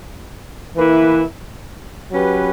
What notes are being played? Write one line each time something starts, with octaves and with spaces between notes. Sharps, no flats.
E3 A#3 E4 B4
F#3 C#4 G4 B4